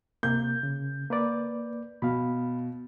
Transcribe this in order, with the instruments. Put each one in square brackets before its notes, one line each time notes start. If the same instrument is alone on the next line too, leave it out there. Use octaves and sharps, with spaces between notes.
[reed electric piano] C3 A#3 [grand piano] G6
[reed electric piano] C#3
A#3 B4 D5
[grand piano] B2 [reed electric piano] F5 B5